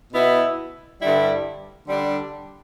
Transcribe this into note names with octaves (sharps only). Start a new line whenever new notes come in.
B2 B3 E4
G2 D3 G3 E4
D3 G3 D4